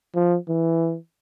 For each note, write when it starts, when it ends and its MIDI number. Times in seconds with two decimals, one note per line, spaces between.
0.15 0.37 53
0.49 0.97 52